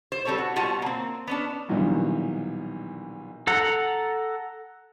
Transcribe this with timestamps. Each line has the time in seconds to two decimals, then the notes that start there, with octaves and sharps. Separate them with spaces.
0.12 C5
0.25 G3 C4 A4 B4 C#5
0.38 F#4
0.56 B2 G3 F4 C#5 F#5 A5
0.82 A#3 C4
1.27 B3 C#4 D4
1.69 A#1 B2 D#3 E3 F#3 G3
3.47 A4 F#5 A#5